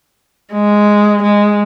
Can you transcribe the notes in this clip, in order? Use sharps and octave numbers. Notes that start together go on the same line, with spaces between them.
G#3
G#3